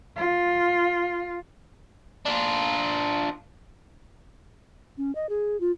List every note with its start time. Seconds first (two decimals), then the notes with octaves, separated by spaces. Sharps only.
0.16 F4
2.25 D4 F4
4.98 C#4
5.15 D#5
5.29 G#4
5.60 F4